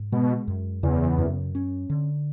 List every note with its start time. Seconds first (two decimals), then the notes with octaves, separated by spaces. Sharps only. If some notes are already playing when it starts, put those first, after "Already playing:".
Already playing: G#2
0.12 B2 G#3
0.48 F#2
0.83 E2 C#3
1.18 F#2
1.55 C#4
1.90 D3